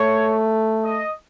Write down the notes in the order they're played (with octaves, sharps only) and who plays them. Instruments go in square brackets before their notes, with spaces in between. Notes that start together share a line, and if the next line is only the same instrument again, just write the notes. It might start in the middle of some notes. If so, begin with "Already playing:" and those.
Already playing: [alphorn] A3 [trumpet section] C#5
[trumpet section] D#5